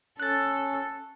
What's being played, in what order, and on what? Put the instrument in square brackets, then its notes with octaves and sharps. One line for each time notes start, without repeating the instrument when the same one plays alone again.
[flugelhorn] C#4 [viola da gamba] A4 [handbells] F#6 A6